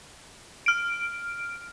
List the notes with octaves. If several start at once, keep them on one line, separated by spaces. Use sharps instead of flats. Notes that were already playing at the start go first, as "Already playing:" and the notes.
F6 D7